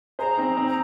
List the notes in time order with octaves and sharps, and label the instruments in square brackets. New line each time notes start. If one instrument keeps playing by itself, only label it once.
[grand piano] G#4 C5 [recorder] A#5
[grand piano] C4 D#4
C4 D#4
[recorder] A#5